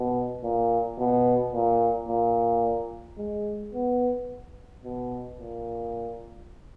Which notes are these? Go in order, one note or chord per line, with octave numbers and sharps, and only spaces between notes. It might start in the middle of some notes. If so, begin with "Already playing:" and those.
Already playing: B2
A#2
B2
A#2
A#2
G#3
B3
B2
A#2